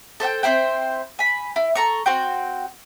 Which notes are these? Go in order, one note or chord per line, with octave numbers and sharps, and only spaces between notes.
A4 C5 F#5 G5
C4 E4 C5 G5
G#5 B5
E4
A4 A#5 C#6
C4 F#4 G5